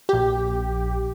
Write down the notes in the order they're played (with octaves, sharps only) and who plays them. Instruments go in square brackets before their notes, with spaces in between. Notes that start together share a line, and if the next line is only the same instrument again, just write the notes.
[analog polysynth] A#1 G4